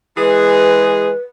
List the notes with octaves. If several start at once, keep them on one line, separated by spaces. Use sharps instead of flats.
E3 G#3 G#4 B4